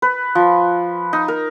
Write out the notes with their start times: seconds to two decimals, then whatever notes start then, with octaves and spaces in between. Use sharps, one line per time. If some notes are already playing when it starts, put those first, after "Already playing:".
0.02 B4
0.35 F3
1.13 D#4
1.28 A#4